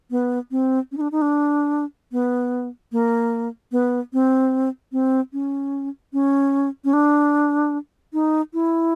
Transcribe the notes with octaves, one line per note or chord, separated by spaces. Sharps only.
B3
C4
C#4
D#4
D4
D#4
D4
B3
A#3
B3
C4
C4
C#4
C#4
C#4
D4
D#4
E4